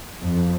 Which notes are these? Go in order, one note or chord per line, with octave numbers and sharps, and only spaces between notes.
F2